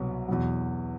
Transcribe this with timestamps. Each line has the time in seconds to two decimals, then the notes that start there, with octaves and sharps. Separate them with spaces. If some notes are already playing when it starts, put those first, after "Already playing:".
Already playing: C2 B2 F#3
0.28 E2 B2 F#3